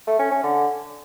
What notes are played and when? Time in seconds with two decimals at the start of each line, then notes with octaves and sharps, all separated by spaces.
0.07 A3
0.19 C#4
0.31 C#4
0.43 D3